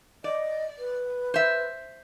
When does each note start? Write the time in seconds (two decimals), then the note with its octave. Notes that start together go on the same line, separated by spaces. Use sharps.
0.24 D5 D#5
0.79 B4
1.34 C5 E5